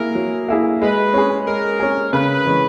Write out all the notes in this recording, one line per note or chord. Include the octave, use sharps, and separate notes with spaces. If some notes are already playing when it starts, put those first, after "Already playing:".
Already playing: A#3 E4 G#4 A#4
F#3
A#3 E4 G#4
G#3 B4
C#4 G#4
G#3 A#4
C#4 G#4
C#3 B4
E3 G#3 C#4